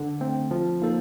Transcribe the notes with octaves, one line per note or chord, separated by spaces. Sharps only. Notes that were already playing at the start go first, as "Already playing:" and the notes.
Already playing: D3
A3 C4
F3
A#3 D#4 A4 C5